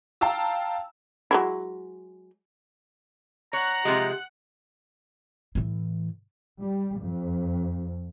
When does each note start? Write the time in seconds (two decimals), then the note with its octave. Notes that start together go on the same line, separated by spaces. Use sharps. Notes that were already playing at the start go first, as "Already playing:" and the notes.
0.21 F5 G5 A5 A#5 E6
1.31 F#3 G#3 E4
3.53 C#5 F#5 A#5 F#6
3.85 C3 F3 G#3 G4
5.55 A2 E3
6.61 G3
7.02 F2